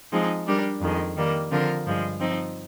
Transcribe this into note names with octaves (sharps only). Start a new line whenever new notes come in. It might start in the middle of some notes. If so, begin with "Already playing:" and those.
F3 G#3 C4 D#4
G3 D4 G4 A#4
F2 D#3 G#3
D#3 G3 A#3
D3 F3 C4 F4 A#4
G2 F3 G#3
F3 C4 D#4